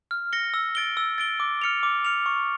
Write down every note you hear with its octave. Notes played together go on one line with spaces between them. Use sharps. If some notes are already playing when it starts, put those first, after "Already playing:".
F6
A#6 C#7 G7
E6
A6 D7 G7
E6
A6 D7 G7
D6
F6 C#7 F7
D6
F6 C#7 F7
C#6